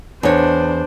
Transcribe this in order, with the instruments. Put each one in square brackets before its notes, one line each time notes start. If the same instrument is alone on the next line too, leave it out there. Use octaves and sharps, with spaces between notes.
[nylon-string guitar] E2 C#5 [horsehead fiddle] D4 C5